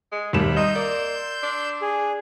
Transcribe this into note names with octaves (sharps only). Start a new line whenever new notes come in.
G#3
D#2 C3 G3 B5 E7
D#4 D#5 C6 E6 G6
A#3 D5
D4
G#4